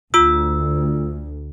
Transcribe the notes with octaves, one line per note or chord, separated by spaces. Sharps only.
D2 F4 E6